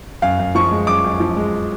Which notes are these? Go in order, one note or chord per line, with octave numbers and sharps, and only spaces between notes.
F#2 F5
F#2
F3 C#6
G#3
F#2 D6
F#2
F3
G#3